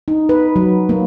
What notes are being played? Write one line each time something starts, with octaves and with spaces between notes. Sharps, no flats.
D#4
B4
F#3
A#3